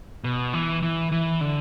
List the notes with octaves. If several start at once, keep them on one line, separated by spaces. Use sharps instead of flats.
B2
E3
E3
E3
D3